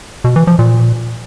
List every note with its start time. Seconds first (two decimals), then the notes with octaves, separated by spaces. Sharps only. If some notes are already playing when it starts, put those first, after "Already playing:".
0.24 B2
0.36 E3
0.47 F3
0.59 A#2